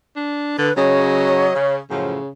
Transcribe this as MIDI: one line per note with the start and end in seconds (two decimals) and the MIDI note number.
0.16 0.55 62
0.58 0.70 50
0.58 0.77 71
0.77 1.48 49
0.77 1.50 54
0.77 1.75 73
0.77 1.50 75
1.54 1.78 49
1.90 2.16 42
1.90 2.16 45
1.90 2.30 49
1.90 2.16 53